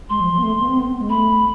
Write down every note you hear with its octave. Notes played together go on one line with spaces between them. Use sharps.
G#3 C6
F3
F3
B3
A3
B3
C4
B3
C4
B3
G#3
A3 B5